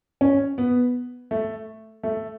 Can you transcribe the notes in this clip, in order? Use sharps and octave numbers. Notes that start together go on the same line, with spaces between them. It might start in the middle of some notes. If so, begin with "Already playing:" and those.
C#4
B3
A3
A3